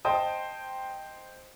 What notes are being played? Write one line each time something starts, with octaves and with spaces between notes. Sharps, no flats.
C5 D#5 G5 A5 D#6